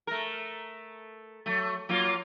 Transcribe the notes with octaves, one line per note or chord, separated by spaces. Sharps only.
A3 A#4
F#3 A3
F#3 A#3 F4